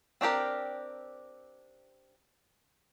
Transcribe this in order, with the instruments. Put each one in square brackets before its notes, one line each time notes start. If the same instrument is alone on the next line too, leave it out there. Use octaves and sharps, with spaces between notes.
[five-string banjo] C4 D4 G4 A#4